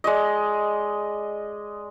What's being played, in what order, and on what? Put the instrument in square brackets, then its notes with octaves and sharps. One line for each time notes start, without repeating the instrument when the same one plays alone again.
[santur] G#3 D5 D#5